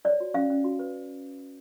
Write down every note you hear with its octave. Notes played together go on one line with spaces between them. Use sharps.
C#5 D5
F#4
C#4 F5
C#4
F#4
B4